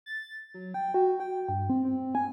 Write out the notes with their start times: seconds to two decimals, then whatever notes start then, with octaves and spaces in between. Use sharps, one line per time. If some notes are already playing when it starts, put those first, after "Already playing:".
0.06 A6
0.54 F#3
0.74 G5
0.94 F#4
1.20 G5
1.49 G2
1.70 C4
1.85 C4
2.15 G#5